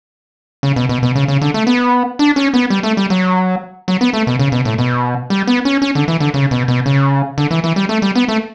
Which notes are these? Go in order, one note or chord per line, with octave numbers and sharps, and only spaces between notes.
C#3
B2
B2
B2
C#3
C#3
D3
A3
B3
D4
C#4
B3
G3
A3
G3
F#3
F#3
B3
A3
B2
C#3
B2
A2
B2
G3
B3
C#4
C#4
D3
E3
D3
C#3
B2
B2
C#3
D3
E3
E3
G3
A3
G3
B3
A3